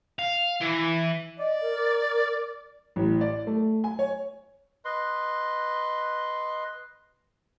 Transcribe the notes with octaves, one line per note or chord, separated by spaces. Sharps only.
F5
E3
D5 D#5
A#4
A1
D5
A3
G#5
C#5
B4 D#5 C6